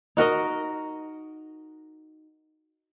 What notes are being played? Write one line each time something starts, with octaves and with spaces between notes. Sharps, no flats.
D#4 F#4 A#4 D#5